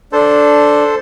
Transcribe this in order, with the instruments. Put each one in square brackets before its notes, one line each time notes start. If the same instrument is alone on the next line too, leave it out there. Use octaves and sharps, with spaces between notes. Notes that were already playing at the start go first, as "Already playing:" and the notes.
[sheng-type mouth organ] D4 [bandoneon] A4 C5